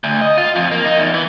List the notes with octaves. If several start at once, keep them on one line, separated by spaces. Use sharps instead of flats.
D2
D#5
F4
F2
A#3
D#4
E2
E3